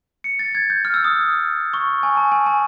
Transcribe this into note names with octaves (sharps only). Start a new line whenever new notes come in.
C#7
A6
G#6
G6
F6
E6
D#6
C#6
G#5
A5
G#5
A5